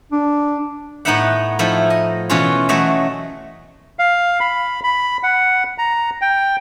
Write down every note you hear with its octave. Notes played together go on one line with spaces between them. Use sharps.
D4
A2 B3 D#4 B4 E5 F#5
F3 A3 D#4 E4
D#5
B2 E3 C#4 F4
E3 F#3 A3 F#4 D#5 E5
F5
B5
B5
F#5
A#5
G5